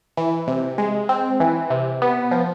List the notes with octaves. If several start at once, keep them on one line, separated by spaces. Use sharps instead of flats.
E3
C3
G#3
C4
E3
C3
B3
F3